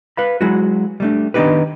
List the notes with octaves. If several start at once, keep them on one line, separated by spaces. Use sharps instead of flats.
B4 F5 B5
F#3 G#3 E4 F#4
G3 A3 D4
D#3 B3 D4 D#4 G4 B4